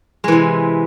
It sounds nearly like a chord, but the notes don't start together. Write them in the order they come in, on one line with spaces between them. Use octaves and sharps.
G#3 E3 C3